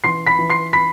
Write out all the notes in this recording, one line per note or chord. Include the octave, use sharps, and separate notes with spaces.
E3 C6 C7
B5 B6
E3
C6 C7
B5 B6